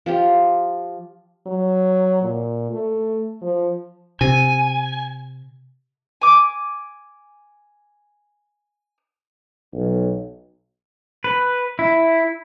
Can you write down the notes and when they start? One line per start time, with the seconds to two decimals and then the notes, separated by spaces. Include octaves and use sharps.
0.06 F3 F4 G4
1.46 F#3
2.22 A#2
2.71 A3
3.42 F3
4.21 C3 G#5
6.22 G#5 D6
9.74 B1
11.24 B4
11.79 E4